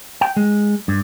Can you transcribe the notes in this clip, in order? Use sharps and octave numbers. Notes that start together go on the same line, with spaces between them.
G5
G#3
G2